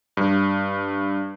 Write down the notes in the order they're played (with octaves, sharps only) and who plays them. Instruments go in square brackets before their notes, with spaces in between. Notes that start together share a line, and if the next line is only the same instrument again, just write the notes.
[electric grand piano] G2